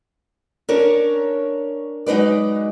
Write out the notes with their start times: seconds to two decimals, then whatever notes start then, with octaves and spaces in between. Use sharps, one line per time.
0.69 C#4 D4 A#4 C#5
2.06 F#3 G#3 D#4 B4 D5